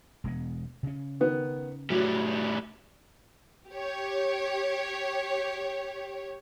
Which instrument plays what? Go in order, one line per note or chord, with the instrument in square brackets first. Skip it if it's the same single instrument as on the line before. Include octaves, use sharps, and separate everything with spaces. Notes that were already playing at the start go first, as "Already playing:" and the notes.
[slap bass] E1 G#3 B3
C#3 C#4
[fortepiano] D#3 B3
[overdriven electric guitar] A2 G3 [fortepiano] F#3
[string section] G4 C#5